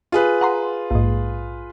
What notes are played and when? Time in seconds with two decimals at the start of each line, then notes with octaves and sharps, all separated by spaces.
0.12 F4 G#4 B4
0.41 F#5 A#5 C6
0.91 A#1 G#2